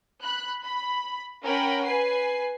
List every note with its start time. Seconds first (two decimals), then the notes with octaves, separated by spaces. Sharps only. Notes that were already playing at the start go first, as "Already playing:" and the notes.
0.22 B5 F#6
0.64 B5
1.42 C#4 A#4 F#5 G5 B5
1.83 B4 G#5 C7